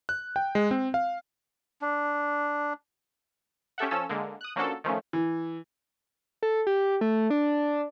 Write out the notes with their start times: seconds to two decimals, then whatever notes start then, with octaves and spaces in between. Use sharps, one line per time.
0.09 F#6
0.36 G5
0.55 G#3
0.71 C4
0.94 F5
1.82 D4
3.78 C#4 G4 A4 E5 F#5
3.91 F3 C#4 A4 E6
4.09 D3 G#3 A#3
4.41 D#6 F#6
4.56 F3 A#3 C#4 D4 F#4 A4
4.84 D#3 F3 A3 C#4
5.13 E3
6.43 A4
6.67 G4
7.01 A3
7.30 D4